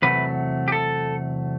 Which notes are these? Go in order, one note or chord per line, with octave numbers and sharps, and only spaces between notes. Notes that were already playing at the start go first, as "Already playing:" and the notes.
E2 C3 F#3 A3 B4
G4
A4